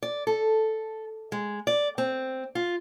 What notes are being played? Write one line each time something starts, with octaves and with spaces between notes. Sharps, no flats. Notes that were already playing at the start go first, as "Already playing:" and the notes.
D5
A4
G#3
D5
C4
F4